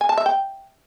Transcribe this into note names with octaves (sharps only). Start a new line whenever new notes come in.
G#5
A5
E5
G5